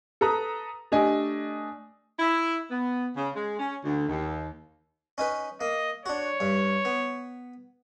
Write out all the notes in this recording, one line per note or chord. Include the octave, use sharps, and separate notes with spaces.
A4 B4 A#5 D#6
A3 D4 G4 D#5 G#5
E4
B3
C#3
G#3
C#4
D2
D#2
C#4 D#4 B4
A#3 D#5
D4 F#4 C#5
G2
B3